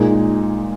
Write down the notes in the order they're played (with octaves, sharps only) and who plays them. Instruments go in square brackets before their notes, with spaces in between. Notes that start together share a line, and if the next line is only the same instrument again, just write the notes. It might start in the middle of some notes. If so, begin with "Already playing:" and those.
Already playing: [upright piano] A#2 G#3 D#4